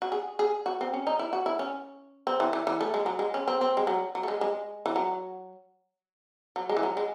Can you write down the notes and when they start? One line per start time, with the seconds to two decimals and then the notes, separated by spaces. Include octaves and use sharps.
0.02 F#4
0.12 G#4
0.39 G#4
0.66 F#4
0.81 C4
0.94 C#4
1.07 D#4
1.19 E4
1.33 F#4
1.46 E4
1.59 C#4
2.27 C4
2.40 E3
2.53 E3
2.67 E3
2.81 A3
2.94 G#3
3.06 F#3
3.19 G#3
3.34 C#4
3.48 C4
3.61 C4
3.77 G#3
3.87 F#3
4.15 F#3
4.23 A3
4.28 G#3
4.41 G#3
4.86 E3
4.96 F#3
6.56 F#3
6.69 G#3
6.77 E3
6.83 F#3
6.97 G#3